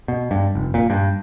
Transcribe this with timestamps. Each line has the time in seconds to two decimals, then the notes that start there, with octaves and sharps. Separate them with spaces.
0.08 B2
0.31 G2
0.55 F1
0.74 A#2
0.90 G2